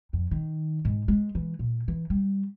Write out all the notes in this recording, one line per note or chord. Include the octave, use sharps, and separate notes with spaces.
F2
D#3
G#2
G#3
E3
A#2
E3
G3